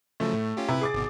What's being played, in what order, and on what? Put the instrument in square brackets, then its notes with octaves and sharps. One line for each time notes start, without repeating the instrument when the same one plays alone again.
[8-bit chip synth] C#3 F3 F#3 [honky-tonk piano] A3
[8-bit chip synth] A2
C#4 F4 G4
[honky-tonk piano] C3 [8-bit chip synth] E4 B4
[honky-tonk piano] G#4 D6 A6
[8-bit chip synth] G#1 B2